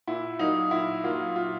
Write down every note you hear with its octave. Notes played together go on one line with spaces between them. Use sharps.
A#2 E4
F#3 A#3 D#4
A#2 E4
F#3 A#3 F4
A#2 F4